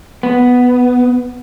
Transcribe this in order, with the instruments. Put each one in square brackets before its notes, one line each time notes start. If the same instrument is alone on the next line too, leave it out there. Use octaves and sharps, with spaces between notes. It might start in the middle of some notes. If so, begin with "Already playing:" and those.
[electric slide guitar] B3